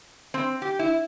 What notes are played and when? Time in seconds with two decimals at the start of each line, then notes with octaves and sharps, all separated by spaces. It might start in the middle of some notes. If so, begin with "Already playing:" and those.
0.34 C4
0.62 G4
0.79 E4